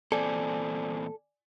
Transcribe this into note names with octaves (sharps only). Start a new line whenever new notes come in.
E2 A#2 C4 A4 D5 G#5